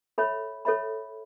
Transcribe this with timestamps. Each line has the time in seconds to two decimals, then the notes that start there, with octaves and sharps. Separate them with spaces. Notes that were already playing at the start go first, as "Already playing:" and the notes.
0.18 A4 C#5 E5 B5
0.65 A4 C#5 E5 B5